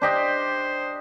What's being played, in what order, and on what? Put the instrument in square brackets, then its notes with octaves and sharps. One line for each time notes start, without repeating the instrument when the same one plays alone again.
[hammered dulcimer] D4 G4 D#5 [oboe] C5